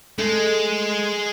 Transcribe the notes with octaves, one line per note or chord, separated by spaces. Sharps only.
G#3 A3